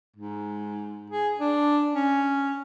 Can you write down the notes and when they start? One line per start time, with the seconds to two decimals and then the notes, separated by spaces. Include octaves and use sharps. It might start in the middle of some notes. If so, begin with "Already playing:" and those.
0.16 G#2
1.10 G#4
1.39 D4
1.94 C#4